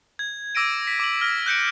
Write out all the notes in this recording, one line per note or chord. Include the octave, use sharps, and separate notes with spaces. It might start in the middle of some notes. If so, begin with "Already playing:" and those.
G#6
D6 E6 A#6 D7 D#7
B6
D6 F#7
F6 A#6
F#6 G6 C#7 D7